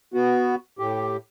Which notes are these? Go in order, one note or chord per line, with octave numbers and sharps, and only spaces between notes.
B3 F#4
A2 G4